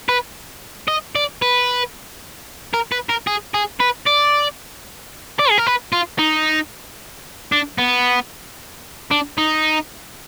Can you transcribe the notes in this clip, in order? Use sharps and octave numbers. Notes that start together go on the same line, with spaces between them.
B4
D#5
D5
B4
A#4
B4
A#4
G#4
G#4
B4
D5
D5
G#4
A#4
B4
F4
D#4
D4
B3
D4
D#4